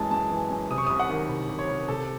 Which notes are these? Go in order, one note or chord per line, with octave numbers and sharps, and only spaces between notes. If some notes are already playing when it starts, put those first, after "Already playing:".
Already playing: F#2 E3 G#3 A5
F#2 A5
E3
F#2
C3 D#6
C#6
D#6
C2
F#5
D#3
C2
C3
C#5
C2
C3 A4